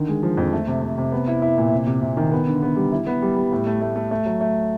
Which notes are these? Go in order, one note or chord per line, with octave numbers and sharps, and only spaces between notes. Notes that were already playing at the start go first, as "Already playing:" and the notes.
Already playing: D3 D#3
G#3
F3
F2
A3
C3
C3
C3
B3
E4
E4
A#2
C3
C3
C3
D#3
B3
D3
B3
G3
E4
B3
G3
G3
A2
A3
A3
A3
A3
F#3
A3